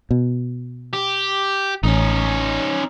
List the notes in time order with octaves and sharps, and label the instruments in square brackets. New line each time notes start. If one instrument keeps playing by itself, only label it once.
[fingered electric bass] B2
[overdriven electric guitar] G4
[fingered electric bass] A1 [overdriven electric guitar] C#4 D#4